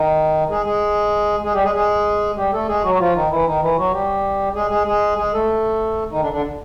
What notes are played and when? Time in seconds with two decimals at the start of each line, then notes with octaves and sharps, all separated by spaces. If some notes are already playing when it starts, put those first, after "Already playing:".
Already playing: D#3 D#4
0.50 G#3 G#4
0.65 G#3 G#4
1.43 G#3 G#4
1.54 G3 G4
1.64 G#3 G#4
1.75 G#3 G#4
2.37 G3 G4
2.53 A3 A4
2.69 G#3 G#4
2.84 F#3 F#4
2.95 F#4
2.99 F3 F4
3.15 D#3 D#4
3.31 E3 E4
3.46 D#3 D#4
3.62 E3 E4
3.78 F#3 F#4
3.93 G3 G4
4.55 G#3 G#4
4.71 G#3 G#4
4.87 G#3 G#4
5.18 G#3 G#4
5.33 A3 A4
6.12 D#3 D#4
6.22 D3 D4
6.32 D3 D4